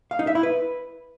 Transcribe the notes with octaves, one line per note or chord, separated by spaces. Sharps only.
F5
D#4
E5
E4
B4